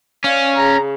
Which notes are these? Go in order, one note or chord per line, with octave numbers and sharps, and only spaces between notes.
C#4 C#5 D5 F5
C#3 A#5